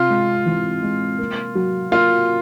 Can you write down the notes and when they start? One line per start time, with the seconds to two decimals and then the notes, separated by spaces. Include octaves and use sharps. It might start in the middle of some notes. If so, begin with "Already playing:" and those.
Already playing: C3 F4
0.10 G#3
0.46 E3
0.83 G#3
1.19 A#3
1.55 F#3
1.91 A#3 F4